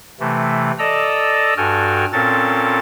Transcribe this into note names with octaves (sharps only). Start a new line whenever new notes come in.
C3 E3 A3
A4 D5 D#5 A#5 E6
G2 F#4 A4 G5 G#5 F6
A#2 C4 C#4 A4 A#4 A6